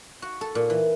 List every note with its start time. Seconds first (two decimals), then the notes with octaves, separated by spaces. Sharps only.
0.22 F#4
0.41 A4
0.55 A#2
0.70 E3